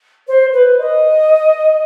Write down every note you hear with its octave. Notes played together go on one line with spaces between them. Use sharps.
C5
B4
D#5